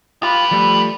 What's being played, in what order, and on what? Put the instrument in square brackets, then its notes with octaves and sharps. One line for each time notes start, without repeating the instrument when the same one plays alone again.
[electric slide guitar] F4 [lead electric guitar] G4 B4
[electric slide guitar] F3 G3 A3